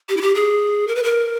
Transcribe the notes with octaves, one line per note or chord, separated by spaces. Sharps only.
G4
E4
G4
G#4
A#4
B4
A#4